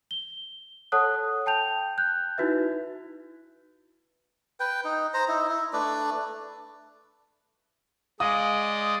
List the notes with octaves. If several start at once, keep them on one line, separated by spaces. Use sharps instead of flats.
G7
A4 C#5 F#5 A5 D#6 F#6
G5 A5 G6 F7
F#6 G6
D#4 E4 F#4 B4 E5
B4 G5
D#4
C5 A#5
D#4 E4
E4
A3 D4 B4 D5
G#3 D5 D#5 F5 D#6